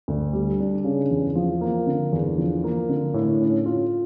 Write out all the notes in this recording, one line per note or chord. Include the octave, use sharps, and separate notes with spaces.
D2
G3
D4
C#3
E2
F3
A#3
D3
E2
F3
A#3
D3
A2
C#4
F4